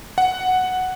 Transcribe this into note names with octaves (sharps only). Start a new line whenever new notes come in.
F#5